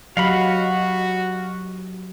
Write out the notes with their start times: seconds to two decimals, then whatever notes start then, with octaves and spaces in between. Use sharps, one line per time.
0.17 F#3 F#4 G4 D#5 F5 F#5 B5